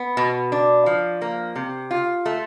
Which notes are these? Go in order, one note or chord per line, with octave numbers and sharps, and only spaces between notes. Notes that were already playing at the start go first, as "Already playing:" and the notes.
Already playing: B3
B2
D4
F3
A#3
C3
F4
A3